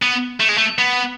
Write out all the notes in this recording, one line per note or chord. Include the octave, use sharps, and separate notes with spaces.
B3
A3
G#3
A3
B3